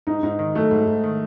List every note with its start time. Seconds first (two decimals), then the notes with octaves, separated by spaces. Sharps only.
0.07 G#2 D#4
0.23 G#2 D#4
0.39 D#3
0.55 F#3 A3
0.71 G#2
0.87 G#2
1.04 D#3